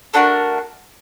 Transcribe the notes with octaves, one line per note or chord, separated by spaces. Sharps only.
A3 D4 F#4 A#4